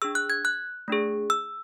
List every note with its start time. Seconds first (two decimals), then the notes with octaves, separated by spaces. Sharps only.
0.02 D4 G#4 E6
0.15 F#6
0.30 G#6
0.45 F#6
0.88 A3 D4 G#4
1.30 E6